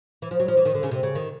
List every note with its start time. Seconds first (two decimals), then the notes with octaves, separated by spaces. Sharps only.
0.22 E3
0.31 F3
0.40 F#3
0.48 F3
0.57 E3
0.65 D#3
0.74 D3
0.83 C#3
0.91 C3
1.03 C#3
1.15 D#3